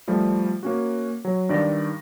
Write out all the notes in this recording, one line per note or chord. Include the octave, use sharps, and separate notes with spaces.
F3 G3 A3
A#3 C#4 F#4
F#3
G2 D#3 D5 A#6